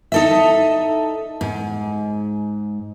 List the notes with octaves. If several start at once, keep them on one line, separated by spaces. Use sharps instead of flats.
D#4 A4 E5
G#2